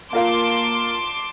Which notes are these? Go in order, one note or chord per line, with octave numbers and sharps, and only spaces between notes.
A#3 F4 A#4 F5 A5 C6 D6